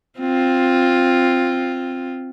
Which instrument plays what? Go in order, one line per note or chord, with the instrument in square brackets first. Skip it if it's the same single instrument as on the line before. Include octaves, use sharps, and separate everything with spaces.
[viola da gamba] C4 F4